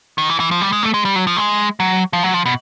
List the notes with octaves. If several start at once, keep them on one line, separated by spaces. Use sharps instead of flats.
D#3
E3
E3
F3
G3
G#3
A3
G#3
G3
F#3
F3
G#3
F#3
F3
F#3
F3
B2